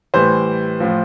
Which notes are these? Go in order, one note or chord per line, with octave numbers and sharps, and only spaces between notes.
A2 E3 G3 C5
A2 F3